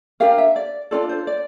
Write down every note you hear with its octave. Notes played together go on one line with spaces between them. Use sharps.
D4 G4 A#4 F5
E5
D5
D4 F4 A4 D5
C5
D5